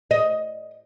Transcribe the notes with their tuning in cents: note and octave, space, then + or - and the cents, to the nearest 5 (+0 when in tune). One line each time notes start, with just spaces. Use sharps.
D#5 +5